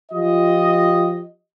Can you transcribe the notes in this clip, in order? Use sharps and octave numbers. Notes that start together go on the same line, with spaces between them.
F3 F4 G4 D#5